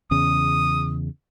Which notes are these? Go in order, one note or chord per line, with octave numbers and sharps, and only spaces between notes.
E2 C#3 D#6